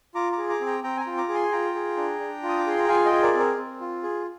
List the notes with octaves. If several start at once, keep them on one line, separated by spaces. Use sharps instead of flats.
F4 A#5 D6
A#5 D6
G#4
A#5 D6
C4
G5 A#5
C4 G5 A#5
G#5
G5 A#5
F4
A#5 D6
G#4
G#5 C6
F4 G5 A#5
G#4
D4
D4
F4
D#6
D6
G#4 C6
A#5
F4 F5 G#5
D#5 G5
G#4
A#4 D5
C4
A#4
C4
F4
G#4